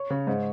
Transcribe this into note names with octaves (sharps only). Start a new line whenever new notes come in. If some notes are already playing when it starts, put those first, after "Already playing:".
Already playing: C#5
C#3
G#2